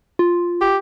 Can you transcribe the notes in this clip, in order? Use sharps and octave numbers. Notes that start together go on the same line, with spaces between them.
F4
G4